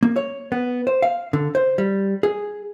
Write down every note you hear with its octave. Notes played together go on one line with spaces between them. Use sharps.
A#3
C#5
B3
C5
F5
D3
C5
G3
G#4